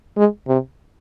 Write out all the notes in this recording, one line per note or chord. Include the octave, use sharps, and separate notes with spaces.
G#3
C3